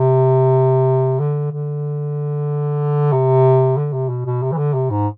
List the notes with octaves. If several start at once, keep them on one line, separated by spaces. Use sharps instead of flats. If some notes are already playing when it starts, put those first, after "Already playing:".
Already playing: C3
D3
D3
C3
D3
C3
B2
B2
C3
E3
D3
C3
G#2